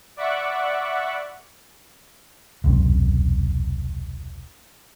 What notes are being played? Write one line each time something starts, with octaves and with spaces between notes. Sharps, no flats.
D5 E5 F#5 B5 C#6 D6
E1 C2 F#2 C3